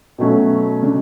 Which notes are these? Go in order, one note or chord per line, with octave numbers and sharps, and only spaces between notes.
B2 F#3 A3 C#4
C#3 G#3 D4